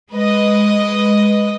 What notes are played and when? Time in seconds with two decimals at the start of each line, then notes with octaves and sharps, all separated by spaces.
0.10 G#3 B4 D#5